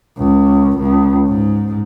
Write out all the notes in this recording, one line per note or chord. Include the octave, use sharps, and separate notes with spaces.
C#2
C#2
G#2